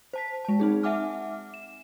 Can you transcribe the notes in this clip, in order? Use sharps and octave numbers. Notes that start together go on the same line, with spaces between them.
C5 A5 B6
G#3 A5
C4 D#4 G#4
E5 F#5 G#5 D6 F6
E7